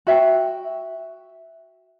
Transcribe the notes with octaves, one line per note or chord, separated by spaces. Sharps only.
F#4 E5 G5